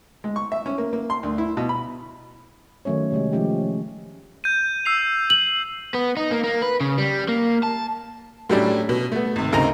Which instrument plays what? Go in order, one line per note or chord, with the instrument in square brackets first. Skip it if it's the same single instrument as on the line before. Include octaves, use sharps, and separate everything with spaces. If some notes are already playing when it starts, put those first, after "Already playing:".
[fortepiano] G#3
C#6
E5
C#4
A#3
A#3
C6
D2
E4
B2
B5
[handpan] D#3 F#3 A3 C#4 C#5
C3 G3 G#3
F3 G#3 A3 C#4 D#4 G4
[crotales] G6 D#7
E6 C7 F7
[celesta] F#7
[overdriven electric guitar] B3
D#4
A#3
A#3
B4
C#3
G3
A#3
A5
[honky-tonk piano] A2 F#3 G3 C#4 D4 E4
B2
A3 B3
G#1 C3
D2 C#3 C4 D#4 A#4 A#5